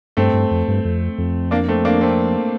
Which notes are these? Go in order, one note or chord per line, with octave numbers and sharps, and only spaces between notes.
G2 A3 C4
G2
F2
G2
F2
F2
A#3 D4
A3 C4
A#3 D4
A3 C4